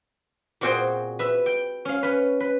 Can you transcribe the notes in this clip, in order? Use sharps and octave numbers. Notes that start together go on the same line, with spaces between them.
A#2 C4 F#4 G#4 G5 C6
B4 E5
G5
C#4 F5
C#4 B4
B4